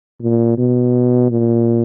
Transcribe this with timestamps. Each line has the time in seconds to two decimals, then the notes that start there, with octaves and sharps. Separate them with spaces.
0.22 A#2
0.58 B2
1.31 A#2